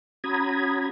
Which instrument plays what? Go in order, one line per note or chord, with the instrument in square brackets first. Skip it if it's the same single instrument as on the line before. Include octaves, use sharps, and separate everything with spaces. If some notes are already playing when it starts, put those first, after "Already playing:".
[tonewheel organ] C#4 F#4 A#5 B5 D#6 G#6